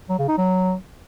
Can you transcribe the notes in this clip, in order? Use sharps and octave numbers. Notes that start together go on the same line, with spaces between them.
F#3
C#3
D#4
F#3